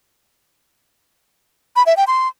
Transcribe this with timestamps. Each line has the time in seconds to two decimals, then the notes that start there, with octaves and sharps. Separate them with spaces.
1.76 B5
1.86 E5
1.97 G5
2.07 C6